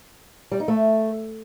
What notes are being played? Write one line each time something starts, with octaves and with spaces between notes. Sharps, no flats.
G3
D#4
A3